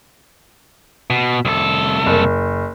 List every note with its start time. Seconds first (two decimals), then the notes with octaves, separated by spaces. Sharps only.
1.10 B2
1.45 C2 A4
2.06 F#1